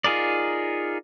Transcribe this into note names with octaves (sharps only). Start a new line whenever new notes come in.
D#4 F4 G#4 A#4 D5